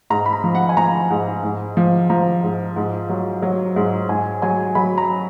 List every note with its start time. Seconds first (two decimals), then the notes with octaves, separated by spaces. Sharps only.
0.10 G#2 A#5
0.26 B5
0.33 A#5
0.44 F3
0.55 F#5
0.69 G#5
0.77 F3 A#5
1.10 G#2
1.43 G#2
1.77 F3
2.10 F3 A#5
2.43 G#2
2.76 G#2
3.09 F#3
3.42 F#3
3.76 G#2
4.09 G#2 G#5
4.42 F#3 G#5
4.75 F#3 B5
4.98 A#5